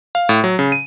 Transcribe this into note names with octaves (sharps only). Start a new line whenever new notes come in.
F5
A2
F#3
C#3
D#7